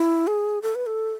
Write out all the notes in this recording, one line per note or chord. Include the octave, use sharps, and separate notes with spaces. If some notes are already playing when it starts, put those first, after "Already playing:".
Already playing: E4
G#4
A4
B4
A4